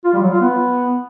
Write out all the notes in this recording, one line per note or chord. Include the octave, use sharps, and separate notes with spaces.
F4
G3
F#3
F4
B3